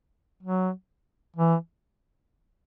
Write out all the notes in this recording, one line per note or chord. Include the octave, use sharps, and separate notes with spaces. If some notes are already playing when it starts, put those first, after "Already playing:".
F#3
E3